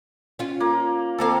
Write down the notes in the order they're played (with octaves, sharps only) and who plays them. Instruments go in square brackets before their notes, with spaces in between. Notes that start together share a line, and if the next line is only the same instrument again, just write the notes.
[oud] C#4 F4
[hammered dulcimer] A#3
[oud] D#2 C4 F5 [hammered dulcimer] A#3 A4